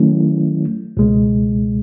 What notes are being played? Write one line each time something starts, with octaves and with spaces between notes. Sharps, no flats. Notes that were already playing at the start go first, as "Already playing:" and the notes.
Already playing: D#3 F#3 A3 C#4 E4
C#2 B2 G#3